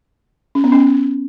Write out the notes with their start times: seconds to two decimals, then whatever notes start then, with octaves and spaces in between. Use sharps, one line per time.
0.55 C#4
0.64 B3
0.72 C#4